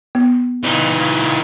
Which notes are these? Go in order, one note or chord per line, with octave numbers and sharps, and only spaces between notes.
B3
A#2 C#3 E3 D#4